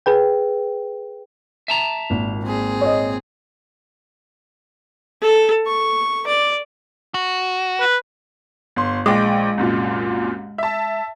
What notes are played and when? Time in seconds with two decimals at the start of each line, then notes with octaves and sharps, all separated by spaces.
0.06 G#4 B4 G5
1.68 E5 A5 A#5
2.10 G#1 A#2
2.43 C4 G#4
2.81 C#5 D#5
5.22 A4
5.67 C#6
6.27 D5
7.14 F#4
7.80 B4
8.76 G1 C6
9.06 A#1 G#3 G5 D6
9.58 C2 F#2 A#2
10.58 E5 A5